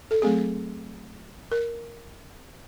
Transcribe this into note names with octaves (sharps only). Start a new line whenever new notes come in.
A4
F#3 A3 C4 G#4
A#4